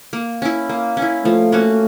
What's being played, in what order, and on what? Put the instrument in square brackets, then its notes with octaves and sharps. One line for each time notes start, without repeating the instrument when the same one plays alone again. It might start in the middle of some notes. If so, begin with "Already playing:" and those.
[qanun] A#3
C#4 E4
A#3
C#4
E4
[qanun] F3 [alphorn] A3
[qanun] A#3 C#4 F#4